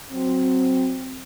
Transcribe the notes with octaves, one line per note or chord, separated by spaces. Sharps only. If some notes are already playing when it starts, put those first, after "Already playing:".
F#3 C4